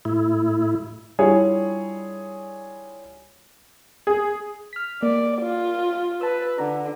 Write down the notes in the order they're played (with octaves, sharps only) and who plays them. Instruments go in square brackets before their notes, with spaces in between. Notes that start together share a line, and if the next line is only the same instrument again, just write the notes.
[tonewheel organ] A2 E4
[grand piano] G3 D4 E4 F4 G#4 C#5
[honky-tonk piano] G#4
[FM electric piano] F6 B6
[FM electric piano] A#3 [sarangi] D5
[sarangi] F4
[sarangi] B4 [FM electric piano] A5 E6
[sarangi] D3 [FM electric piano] A#5